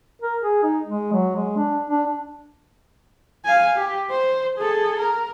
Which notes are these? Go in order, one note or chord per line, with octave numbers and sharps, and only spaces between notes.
A#4
G#4
D#4
G#3
F#3
G#3
D4
D4
F5 G#5
G4
C5
G#4 A4
A#4